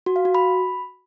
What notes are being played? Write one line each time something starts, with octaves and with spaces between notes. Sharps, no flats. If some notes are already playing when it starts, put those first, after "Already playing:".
F#4
F5
F#4
B5